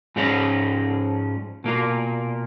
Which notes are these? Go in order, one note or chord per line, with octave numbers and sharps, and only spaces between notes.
G#2 F3 G#3 C#4
B2 A#3 F4